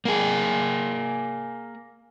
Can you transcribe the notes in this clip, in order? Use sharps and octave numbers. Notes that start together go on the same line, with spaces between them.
A#3 G#4